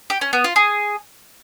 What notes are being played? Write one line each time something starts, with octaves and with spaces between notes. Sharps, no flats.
G4
C#4
B3
F4
G#4